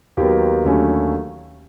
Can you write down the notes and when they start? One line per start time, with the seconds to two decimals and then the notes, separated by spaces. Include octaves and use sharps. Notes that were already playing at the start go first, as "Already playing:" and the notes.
0.17 D#2 D#3 F#3 B3 G4
0.65 D#2 D3 F#3 A3 C#4